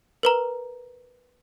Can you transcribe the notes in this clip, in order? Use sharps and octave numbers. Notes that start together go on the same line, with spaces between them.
A#4 B4 A#5